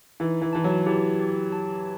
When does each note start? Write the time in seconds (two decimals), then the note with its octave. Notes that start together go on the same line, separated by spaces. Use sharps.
0.20 E3 D#4
0.41 E3
0.53 E3 A5
0.64 F#3
0.86 E3 G4
1.20 G4
1.52 A5